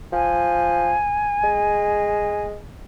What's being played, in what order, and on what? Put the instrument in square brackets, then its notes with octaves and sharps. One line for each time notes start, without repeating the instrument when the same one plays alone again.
[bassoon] F3 [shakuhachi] G#5
[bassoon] G#3